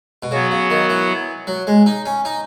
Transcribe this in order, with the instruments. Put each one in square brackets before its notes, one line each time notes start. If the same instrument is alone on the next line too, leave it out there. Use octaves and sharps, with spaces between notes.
[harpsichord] B2
[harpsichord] C#3 [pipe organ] F#3 B3 F#4
[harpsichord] C#3
D#3
E3
F#3
G#3
D#4
C#4
D#4